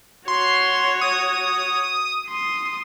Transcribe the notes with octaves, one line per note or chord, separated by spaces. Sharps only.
F#4 C#5 C6
D#6
C6 D#6